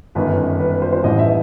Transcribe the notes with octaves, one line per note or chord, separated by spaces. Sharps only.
G1 F#2 D#3 B4
B4
B4
C5
C5
A1 G2 E3 D#5
E5